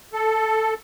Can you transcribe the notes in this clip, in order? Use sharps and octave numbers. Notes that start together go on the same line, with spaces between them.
A4